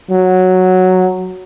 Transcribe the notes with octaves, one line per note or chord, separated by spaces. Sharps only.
F#3